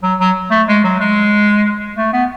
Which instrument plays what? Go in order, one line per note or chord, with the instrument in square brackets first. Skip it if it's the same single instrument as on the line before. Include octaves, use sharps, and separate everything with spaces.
[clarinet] F#3
F#3
A3
G#3
F#3
G#3
A3
B3